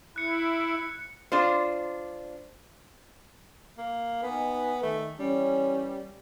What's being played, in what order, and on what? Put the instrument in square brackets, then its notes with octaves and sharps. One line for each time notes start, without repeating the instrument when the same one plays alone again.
[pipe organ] E4 [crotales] F#6 C#7
[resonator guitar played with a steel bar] D4 F4 C5
[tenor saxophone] A#3
[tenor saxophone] B3 [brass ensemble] D#4 G#5
[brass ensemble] D#3 [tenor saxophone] A3
[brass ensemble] E3 C#4 [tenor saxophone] G3